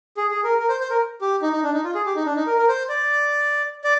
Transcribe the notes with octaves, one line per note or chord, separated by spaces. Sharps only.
G#4
G#4
A#4
A#4
C5
C5
A#4
G4
D#4
D#4
D4
D#4
F4
G#4
G4
D#4
D4
D#4
A#4
A#4
C5
D5
D5